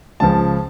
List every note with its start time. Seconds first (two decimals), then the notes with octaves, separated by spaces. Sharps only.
0.20 C#2 C#3 F3 A5